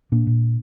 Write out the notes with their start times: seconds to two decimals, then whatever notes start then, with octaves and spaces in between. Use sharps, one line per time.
0.12 A#2 A#3 D4
0.27 A#2